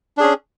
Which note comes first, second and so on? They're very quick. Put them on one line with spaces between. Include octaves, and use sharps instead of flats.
D4 G#4 C#4